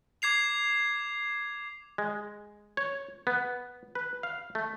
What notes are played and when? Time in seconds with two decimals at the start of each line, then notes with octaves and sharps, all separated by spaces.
0.22 D6 G#6 C7 F7
1.98 G#3
2.77 C#5
3.27 B3
3.95 B4
4.23 F5
4.55 A3